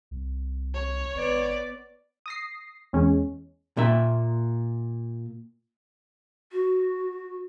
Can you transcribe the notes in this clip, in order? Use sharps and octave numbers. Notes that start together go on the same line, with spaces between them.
C2
C#5
G#1 B3 D5
D#6 A#6 C7
E2 G#3 C#4
A#2 E5
F#4